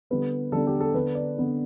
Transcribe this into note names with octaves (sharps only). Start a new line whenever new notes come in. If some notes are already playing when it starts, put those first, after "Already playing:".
D3 G3 B3 D4 B4
D3 G3 B3 D4 A4
G4
A4
D3 B3 D4 B4
D5
D3 B3 D4